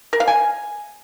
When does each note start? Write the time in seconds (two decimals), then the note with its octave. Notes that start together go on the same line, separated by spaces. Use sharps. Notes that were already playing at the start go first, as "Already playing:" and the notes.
0.13 A#4
0.20 F5
0.27 G#5